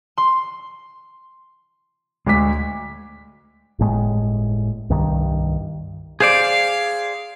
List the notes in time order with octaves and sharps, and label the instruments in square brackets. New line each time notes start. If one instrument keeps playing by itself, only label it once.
[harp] C6
[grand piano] D2 D6 B6 [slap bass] G#3
[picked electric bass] G1 A2 G#3
C2 G2 D#3
[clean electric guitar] G#4 C5 D5 [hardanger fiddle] F5